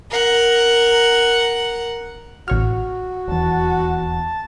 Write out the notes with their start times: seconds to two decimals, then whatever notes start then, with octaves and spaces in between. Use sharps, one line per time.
0.11 A#4 F#5
2.48 A1 F#4 C#5 F6
3.27 D#1 E2 A5